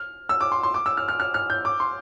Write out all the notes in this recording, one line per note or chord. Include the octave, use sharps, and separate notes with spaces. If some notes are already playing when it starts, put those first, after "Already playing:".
Already playing: F6
E6
D6
C6
C6
D6
E6
F6
F6
F6
F6
G6
D6
C6